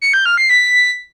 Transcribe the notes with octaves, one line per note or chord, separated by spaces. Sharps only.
C#7
G6
F6
C7
B6